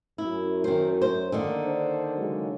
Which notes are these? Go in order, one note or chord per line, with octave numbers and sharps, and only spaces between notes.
F#2 E4
D#3 C5
C5
D3 D#3 A#3
D4 C5
C#3 F#3 G#3